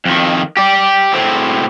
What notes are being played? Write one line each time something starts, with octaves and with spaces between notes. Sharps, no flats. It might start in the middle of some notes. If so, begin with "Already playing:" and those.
F2 D#3
G4 D5
A2 C4